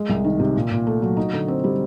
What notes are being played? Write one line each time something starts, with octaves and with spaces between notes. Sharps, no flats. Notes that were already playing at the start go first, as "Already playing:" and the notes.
Already playing: G#3
C2
D#3
C3
A#2
A#2
A3
F#3
D#4
D3
C4
G3